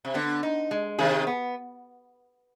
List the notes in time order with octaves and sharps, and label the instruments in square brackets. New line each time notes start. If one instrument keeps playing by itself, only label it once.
[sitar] C3
[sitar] D3 [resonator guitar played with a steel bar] B3
[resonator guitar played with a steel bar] D#4
G#3
[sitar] C3 D#3 [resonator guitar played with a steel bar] G#4
[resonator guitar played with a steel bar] B3